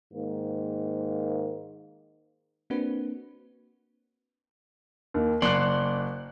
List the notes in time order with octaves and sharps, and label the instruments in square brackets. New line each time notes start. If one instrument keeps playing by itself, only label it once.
[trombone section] G#2 D#3 A#3
[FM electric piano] A#3 C4 D4 F#4 B4
[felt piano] D#2 D#3
[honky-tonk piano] F#1 F#6 [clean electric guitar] D5 C6 [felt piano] C#7